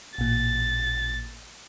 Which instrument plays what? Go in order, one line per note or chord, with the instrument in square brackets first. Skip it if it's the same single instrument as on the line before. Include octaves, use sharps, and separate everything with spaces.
[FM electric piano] A1 A#2 [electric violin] A6